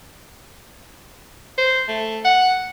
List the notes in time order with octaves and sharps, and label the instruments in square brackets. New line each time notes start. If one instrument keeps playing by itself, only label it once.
[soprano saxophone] C5
A3
F#5